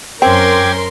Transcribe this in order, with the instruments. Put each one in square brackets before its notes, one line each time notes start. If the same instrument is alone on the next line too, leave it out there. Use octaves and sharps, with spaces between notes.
[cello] F#2 C#4 [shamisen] C4 [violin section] A#4 C6 [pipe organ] G5 D6 G#6